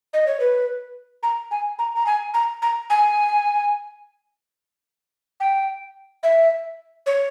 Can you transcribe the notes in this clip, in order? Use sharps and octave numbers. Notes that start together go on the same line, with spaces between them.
D#5
C#5
B4
A#5
G#5
A#5
A#5
G#5
A#5
A#5
G#5
G5
E5
C#5